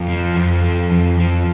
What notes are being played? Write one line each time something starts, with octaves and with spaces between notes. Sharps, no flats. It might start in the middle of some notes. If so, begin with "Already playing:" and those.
Already playing: F2 F4
F3
F2
F3
F2
F3